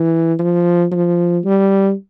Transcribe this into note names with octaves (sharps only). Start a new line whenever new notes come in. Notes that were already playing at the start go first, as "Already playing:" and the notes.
Already playing: E3
F3
F3
G3